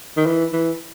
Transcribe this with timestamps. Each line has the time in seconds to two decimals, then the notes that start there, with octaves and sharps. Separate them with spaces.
0.17 D#3
0.26 E3
0.53 E3